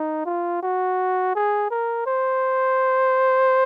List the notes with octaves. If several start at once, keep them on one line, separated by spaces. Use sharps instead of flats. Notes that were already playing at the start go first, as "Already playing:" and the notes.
Already playing: D#4
F4
F#4
G#4
A#4
C5